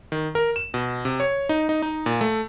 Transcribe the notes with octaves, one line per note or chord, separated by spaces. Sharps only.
D#3
A#4
E7
B2
C3
C#5
D#4
D#4
D#4
A#2
A3